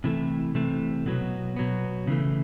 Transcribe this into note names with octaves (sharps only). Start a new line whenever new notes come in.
C3 E3 A3
C3 E3 A3
B2 F#3 B3
B2 F#3 B3
C#3 E3 A3